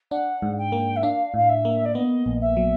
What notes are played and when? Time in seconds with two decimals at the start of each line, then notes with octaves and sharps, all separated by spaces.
0.11 D4 F#5
0.42 G#2
0.58 G5
0.72 A#3
0.96 E5
1.03 D4 F5
1.34 A2 F5
1.49 E5
1.65 A#3
1.85 D5
1.94 B3 D#5
2.26 A#1
2.41 E5
2.57 F#3